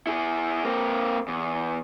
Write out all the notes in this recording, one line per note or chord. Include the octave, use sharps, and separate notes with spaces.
E4 G#4
A#3 C4
E2